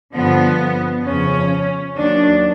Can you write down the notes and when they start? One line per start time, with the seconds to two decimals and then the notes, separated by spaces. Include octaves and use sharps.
0.14 G2 D3 F3 B3
1.05 F2 C#3 F3 C#4
1.95 D#2 D#3 F#3 D4